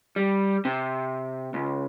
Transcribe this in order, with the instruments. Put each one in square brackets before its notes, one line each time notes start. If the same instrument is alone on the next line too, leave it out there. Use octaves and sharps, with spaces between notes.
[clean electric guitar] G3
C3
C#2